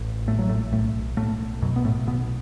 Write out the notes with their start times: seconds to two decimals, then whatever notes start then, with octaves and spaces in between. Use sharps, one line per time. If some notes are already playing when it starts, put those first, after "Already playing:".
Already playing: A1
0.27 A2 A3
0.39 F#3
0.49 A2 A3
0.72 B1 A2 A3
1.17 B1 A2 A3
1.62 F#2 B2 F#3
1.76 B3
1.84 A2 A3
2.07 B1 B2 B3